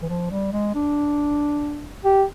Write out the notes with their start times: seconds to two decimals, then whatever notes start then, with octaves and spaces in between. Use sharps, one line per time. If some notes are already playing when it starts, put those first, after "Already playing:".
0.02 E3
0.09 F3
0.31 G3
0.52 G#3
0.75 D4
2.04 G4